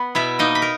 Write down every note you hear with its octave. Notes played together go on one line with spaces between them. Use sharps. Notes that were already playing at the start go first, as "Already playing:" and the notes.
Already playing: B3 B4
B2 E4 E5
A#3 D#4 D#5
B5
A#4